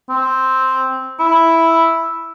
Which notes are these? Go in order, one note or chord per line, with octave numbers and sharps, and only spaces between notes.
C4
E4